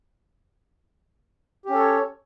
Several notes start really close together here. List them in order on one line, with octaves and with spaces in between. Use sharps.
G4 C#4 A4 C#5